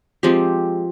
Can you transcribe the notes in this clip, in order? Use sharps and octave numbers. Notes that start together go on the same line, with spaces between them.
F3 G#3 C4 G4